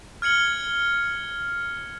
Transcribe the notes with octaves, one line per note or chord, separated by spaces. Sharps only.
F6 G#6 C#7 F#7 G7